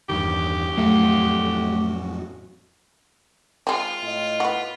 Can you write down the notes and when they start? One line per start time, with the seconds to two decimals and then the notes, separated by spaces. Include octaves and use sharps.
0.09 E2 G2 D#3 G4
0.77 F2 A2 F#3 A3 F#4 F5 F#5
3.67 G#3 C4 F4
4.02 A2 D#5
4.40 B3 F#4